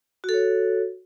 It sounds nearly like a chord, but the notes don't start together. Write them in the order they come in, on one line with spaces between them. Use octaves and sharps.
F#4 A4 C#5